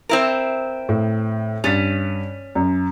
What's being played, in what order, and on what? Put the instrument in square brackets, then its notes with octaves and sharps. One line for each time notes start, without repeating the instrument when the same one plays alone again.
[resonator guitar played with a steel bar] C4 E4 A#4
[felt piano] A2
[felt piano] G2 A6 B6 [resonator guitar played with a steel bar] C#4
[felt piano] F#2